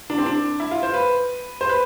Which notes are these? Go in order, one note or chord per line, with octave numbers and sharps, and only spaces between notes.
D4
C4
D4
E4
F4
C5
B4
C5
B4